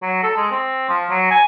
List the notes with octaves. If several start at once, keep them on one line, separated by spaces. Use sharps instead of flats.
F#3
A4
G#3
C4
F3
F#3
G#5